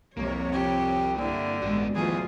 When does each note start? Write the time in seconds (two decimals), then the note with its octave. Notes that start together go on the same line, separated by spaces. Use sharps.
0.17 C2 F2 C3 A#3 C#5
0.52 C4 F4 G4
1.18 G2 D3 A#3 E4
1.62 A1 G#3 B3 F#4 D5
1.95 D2 B2 E3 F#3 F4 G#4